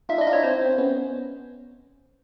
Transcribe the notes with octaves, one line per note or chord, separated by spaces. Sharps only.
D#4 F4 E5
D4 E4
D#5
D#4 F4
D4 E4 C#5
C4 C5
C4
B3 C#4